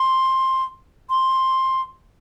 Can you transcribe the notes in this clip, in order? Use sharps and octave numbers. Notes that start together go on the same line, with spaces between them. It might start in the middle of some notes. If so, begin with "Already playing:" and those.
Already playing: C6
C6